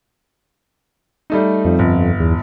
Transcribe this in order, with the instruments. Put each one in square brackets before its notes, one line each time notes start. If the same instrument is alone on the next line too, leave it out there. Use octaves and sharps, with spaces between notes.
[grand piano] G3 A3 D#4
[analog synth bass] F2
[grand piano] G1
[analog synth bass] E2